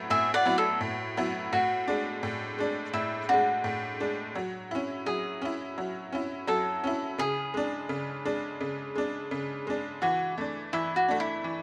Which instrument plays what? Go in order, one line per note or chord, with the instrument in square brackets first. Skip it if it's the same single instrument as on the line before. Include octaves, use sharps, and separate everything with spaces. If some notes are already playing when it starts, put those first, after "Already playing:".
Already playing: [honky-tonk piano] A2 F#3 B3 E4
[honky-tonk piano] A2 [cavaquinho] E5 G#5
[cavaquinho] D5 F#5
[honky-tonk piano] F#3 B3 E4
[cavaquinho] A4
[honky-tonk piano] A2
F#3 B3 E4
[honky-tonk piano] A2 [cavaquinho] F#4
[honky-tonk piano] G#3 D4
A2
G#3 D4
[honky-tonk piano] A2 [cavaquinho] E4
[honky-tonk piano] G#3 D4 [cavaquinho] F#4
[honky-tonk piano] A2
G#3 D4
F#3
C#4 E4
[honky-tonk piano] F#3 [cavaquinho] G#4
[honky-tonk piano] C#4 E4
F#3
C#4 E4
[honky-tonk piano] F#3 [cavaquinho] A4
[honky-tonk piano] C#4 E4
[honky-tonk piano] C#3 [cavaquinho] G#4
[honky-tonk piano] G#3 D4
C#3
G#3 D4
C#3
G#3 D4
C#3
G#3 D4
[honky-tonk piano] E3 [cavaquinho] F#4
[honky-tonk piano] A3 D4
[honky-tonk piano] E3 [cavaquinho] E4
[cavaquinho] F#4
[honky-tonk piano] A3 D4
[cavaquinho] E4
[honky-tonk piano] E3